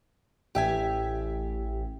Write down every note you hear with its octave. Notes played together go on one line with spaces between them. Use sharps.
A1 G4 E5 G#5